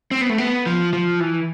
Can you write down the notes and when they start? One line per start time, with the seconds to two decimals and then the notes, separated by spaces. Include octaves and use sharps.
0.11 C4
0.21 B3
0.29 A3
0.38 B3
0.66 F3
0.93 F3
1.20 E3